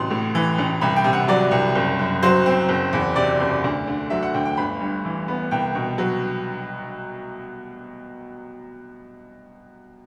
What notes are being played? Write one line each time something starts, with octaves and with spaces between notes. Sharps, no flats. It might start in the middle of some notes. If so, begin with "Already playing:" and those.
Already playing: A1 C3 F#3 C6
A2
E3
A1
C2 B5
G5
C3
F#5
F#3 D5
C2
F#1
F#2
F#3 C5
C4
F#1
E2
C3 D5
F#1
D2
D3
F#3 E5
F#5
D2 G5
G5
G1 B5
G2
E3
B3
C2 G5
B2
F#3